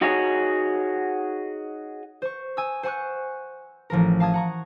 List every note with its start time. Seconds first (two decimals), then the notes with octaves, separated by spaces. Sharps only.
0.01 D#4 F#4 G#4 C#5
2.22 C5 C#6
2.57 G#5 D#6 E6
2.83 C5 F#5 G#5 C#6 F#6
3.90 A1 F3 A#4
4.20 F5 A5 D#6 G#6
4.33 F#5 A#5 C#6